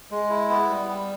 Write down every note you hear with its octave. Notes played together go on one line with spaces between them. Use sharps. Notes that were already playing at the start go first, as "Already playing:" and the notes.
G#3
E4
B3
G3
G3